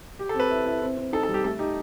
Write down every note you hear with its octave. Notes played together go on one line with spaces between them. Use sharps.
G4
A4
C4
B4
E4
E4
C4
C4
D#4 A4
A4
G3
G4
A3 A4
D#4 G4